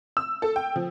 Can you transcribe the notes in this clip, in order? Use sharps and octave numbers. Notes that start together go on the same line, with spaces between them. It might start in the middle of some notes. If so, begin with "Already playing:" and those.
E6
A4
G5
F3